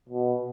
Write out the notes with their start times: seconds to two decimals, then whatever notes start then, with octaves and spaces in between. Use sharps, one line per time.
0.09 B2